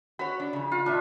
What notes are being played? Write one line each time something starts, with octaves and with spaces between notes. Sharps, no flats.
F#4 C#5 B5
D4
F2 C#3
F4
A2 D4 C#5 E5